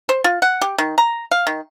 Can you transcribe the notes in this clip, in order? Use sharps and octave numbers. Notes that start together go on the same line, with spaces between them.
C5
F4
F#5
G4
D#3
A#5
F5
D#3